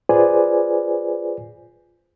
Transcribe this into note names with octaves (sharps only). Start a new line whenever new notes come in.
F4 G#4 B4 C5 D5 G#5